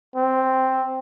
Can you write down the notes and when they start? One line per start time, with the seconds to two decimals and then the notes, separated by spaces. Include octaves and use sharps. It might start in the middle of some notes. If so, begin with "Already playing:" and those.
0.16 C4